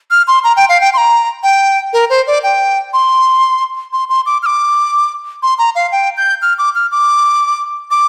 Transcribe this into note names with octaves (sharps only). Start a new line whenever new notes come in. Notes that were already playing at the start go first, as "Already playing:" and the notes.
F6
C6
A#5
G5
F5
G5
C6
A#5
G5
A#4
C5
D5
G5
C6
C6
C6
D6
F6
D6
C6
A#5
F5
G5
G6
F6
D6
F6
D6
D6